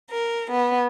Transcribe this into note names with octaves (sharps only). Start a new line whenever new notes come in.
A#4
B3